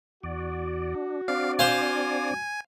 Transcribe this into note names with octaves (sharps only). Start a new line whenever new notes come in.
E2 F#4 D5
D4
C4 D4 D5 F5
C5 F5 G#5